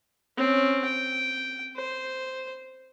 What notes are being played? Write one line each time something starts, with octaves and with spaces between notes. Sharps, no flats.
C4 C#4
G5
C5